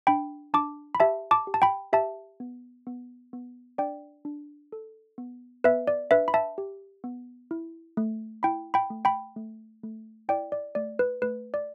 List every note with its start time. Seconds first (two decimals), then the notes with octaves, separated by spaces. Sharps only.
0.07 D4 G5 B5
0.54 D4 A5 D6
0.95 B5
1.00 G4 E5 A5
1.31 A5 D6
1.47 G4
1.54 A5
1.62 G5 B5
1.93 G4 E5 A5
2.40 B3
2.87 B3
3.33 B3
3.78 D4 D5 G5
4.25 D4
4.72 A4
5.18 B3
5.64 B3 B4 E5
5.87 D5
6.11 D4 B4 E5
6.28 B5
6.34 E5 A5
6.58 G4
7.04 B3
7.51 E4
7.97 A3
8.43 E4 G5 B5
8.74 G5 B5
8.90 A3
9.05 G5 B5
9.36 A3
9.83 A3
10.29 E4 D5 G5
10.52 D5
10.75 A3 D5
10.99 B4
11.22 A3 B4
11.54 D5